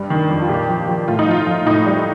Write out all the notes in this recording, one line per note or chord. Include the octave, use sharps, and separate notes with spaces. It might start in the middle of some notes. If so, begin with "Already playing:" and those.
Already playing: G2 G3
D#3
F2
F4
A#2 G4
F3
F3
A2 F4
D#4
F3 F4
F3
A2 D#4
G3